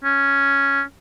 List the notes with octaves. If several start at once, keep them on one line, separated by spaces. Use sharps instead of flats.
C#4